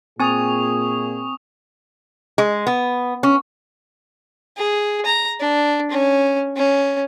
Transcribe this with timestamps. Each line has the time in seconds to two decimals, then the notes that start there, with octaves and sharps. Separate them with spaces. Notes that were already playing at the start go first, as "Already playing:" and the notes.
0.20 A#2 C4 G#4 G#5 C#6 D#6 F7
2.38 G#3
2.67 B3
3.23 C#4
4.57 G#4
5.06 A#5
5.40 D4
5.91 C#4
6.57 C#4